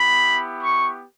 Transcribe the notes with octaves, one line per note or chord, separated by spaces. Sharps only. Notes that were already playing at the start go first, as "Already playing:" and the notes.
Already playing: B3 E4 G4 B5
C#6